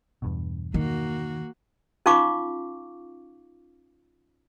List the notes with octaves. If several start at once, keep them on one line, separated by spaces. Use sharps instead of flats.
E2 G2 B2
D#3 A#3 F#4
C#4 D#4 F4 F5 C#6 D6